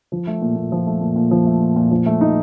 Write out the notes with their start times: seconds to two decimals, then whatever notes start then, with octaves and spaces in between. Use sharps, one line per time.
0.12 F3
0.27 A3
0.42 A#2
0.56 A#2
0.72 F3
0.87 A3
1.01 A#2
1.16 A#2
1.31 F3
1.46 A3
1.61 A#2
1.76 A#2
1.91 F3
2.06 A3
2.21 D#4